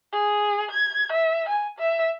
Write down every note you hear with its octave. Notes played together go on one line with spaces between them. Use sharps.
G#4
G#6
E5
G#5
E5